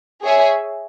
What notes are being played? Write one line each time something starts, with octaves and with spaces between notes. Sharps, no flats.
G#4 C#5 E5 G#5